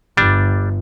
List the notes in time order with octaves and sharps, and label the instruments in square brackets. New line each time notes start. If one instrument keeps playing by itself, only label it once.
[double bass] G1 G2 [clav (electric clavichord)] G3 D4